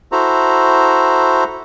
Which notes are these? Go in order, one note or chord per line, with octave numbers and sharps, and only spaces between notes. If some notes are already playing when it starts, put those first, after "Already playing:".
E4 F#4 A4 C5 A#5